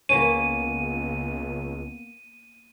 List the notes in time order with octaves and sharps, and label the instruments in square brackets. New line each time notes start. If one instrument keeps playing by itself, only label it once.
[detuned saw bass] C#2 [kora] A#3 B3 C#4 [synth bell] D#7